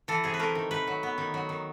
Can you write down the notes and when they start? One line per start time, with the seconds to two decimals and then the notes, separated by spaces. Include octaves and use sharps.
0.08 E3 A4
0.24 C3 G#4
0.34 B4
0.39 A3 A#4
0.55 D#3
0.71 D#3 B4
0.87 F#3
1.03 B3
1.18 D#3
1.34 F#3
1.49 D#3